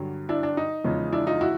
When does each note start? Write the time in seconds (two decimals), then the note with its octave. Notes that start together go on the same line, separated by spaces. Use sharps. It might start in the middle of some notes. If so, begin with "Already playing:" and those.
Already playing: G2 D3 F#3
0.29 D4 E4
0.43 D4
0.57 D#4
0.84 E2 C#3 F3 G#3
1.13 D4 E4
1.27 D#4 F4
1.41 E4 F#4